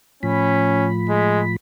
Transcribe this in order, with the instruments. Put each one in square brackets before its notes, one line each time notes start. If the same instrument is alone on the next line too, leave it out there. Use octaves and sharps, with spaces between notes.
[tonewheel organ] A2 F3 B5 [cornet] C#4
[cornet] G#3